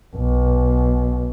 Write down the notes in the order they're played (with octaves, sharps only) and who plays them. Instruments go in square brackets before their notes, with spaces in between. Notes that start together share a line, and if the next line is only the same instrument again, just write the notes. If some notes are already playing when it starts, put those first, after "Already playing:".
[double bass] B1